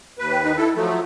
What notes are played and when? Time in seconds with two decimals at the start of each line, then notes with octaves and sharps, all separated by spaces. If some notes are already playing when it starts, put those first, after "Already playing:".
0.19 D#2 B4
0.32 G5
0.44 D#4
0.57 E4 A4
0.76 F3 F#3 A3 A4
0.89 F4